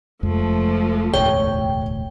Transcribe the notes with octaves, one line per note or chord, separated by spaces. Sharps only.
F1 F2 F3 G#3 A3
E1 A1 D2 C#5 G5